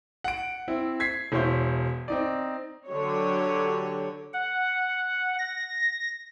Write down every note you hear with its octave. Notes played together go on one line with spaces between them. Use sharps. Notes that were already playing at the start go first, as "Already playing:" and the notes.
F#5 D7
C4 E4
G#6 B6 C7
E1 E4 C5 C#5 C6 G6
C4 D#4 D5
D3 F#3 G4 C#5
F#5
A#6